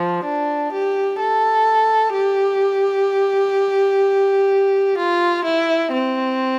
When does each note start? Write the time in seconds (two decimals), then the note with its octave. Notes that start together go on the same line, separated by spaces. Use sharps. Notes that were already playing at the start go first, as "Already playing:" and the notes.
Already playing: F3
0.24 D4
0.72 G4
1.19 A4
2.14 G4
4.98 F4
5.45 E4
5.93 C4